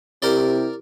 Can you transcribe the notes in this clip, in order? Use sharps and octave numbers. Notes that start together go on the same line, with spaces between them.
C3 E4 G4 A#4 D5